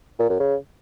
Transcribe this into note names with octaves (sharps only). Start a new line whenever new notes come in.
A#2
F#2
C#3